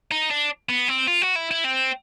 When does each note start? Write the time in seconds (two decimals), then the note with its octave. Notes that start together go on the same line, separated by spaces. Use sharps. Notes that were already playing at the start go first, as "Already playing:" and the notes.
0.11 D#4
0.31 D4
0.69 B3
0.88 C4
1.07 F4
1.22 F#4
1.36 E4
1.51 E4
1.64 C4